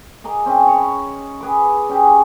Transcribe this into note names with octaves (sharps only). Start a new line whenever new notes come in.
G#4 D#5 A#5 D6
C4 C#4 D#5
C#5 B5
G#4 B4 D6
C#4 G4 G#4